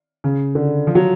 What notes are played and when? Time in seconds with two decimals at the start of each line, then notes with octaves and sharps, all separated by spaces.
0.24 C#3
0.55 D3
0.87 F3
0.95 F#3